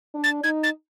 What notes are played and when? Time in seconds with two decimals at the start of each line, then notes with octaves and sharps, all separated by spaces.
0.14 D4
0.24 A6
0.44 D#4 G#6
0.63 A6